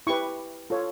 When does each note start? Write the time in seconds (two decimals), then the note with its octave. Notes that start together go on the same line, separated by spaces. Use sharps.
0.07 E4 G4 B4 C#6
0.70 F4 A4 C#5